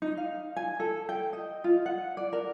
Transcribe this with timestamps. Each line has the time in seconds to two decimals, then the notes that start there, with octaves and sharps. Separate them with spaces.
0.02 D#4
0.17 F5
0.56 G#5
0.80 A4
1.09 G5
1.33 D#5
1.64 F4
1.86 F#5
2.17 D5
2.33 A#4